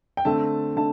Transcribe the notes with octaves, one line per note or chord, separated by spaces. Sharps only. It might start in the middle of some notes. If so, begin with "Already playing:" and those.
G5
D3 A3 C4 A5
D3 A3 A5